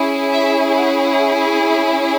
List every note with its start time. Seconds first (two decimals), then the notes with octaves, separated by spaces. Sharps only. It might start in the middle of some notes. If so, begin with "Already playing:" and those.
Already playing: C#4 E4 G#4
0.33 E5
0.77 F#5
1.06 F#5
1.34 G#5